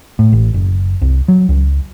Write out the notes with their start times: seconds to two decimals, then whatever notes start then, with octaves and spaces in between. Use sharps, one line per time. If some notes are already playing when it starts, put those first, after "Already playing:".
0.19 A2
0.33 A1
0.54 F#1
1.02 C2
1.28 F#3
1.49 C#2